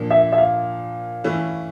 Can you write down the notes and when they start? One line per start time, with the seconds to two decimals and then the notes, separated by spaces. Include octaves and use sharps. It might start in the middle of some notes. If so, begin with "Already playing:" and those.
Already playing: A#2 F3 A#3 D4
0.11 E5
0.33 E5
0.38 F5
1.24 E3 A3 C#4 E4